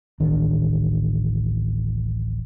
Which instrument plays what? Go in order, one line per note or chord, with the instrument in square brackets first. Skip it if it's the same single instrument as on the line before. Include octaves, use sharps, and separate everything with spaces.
[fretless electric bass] D1 A1 D#3 D4